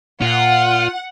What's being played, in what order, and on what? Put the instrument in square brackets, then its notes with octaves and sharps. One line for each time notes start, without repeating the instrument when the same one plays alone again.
[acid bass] A#2 [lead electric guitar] F4 [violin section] F#5